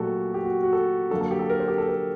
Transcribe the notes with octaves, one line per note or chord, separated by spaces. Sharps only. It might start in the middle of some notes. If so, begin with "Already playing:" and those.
Already playing: A#2 F#3 A3 F#4 G4 A4
G4
F#4
F#4
A4
D3 F#3 A#3 A4
A4
G4
A4
A#4
C5
G4
A4
A#4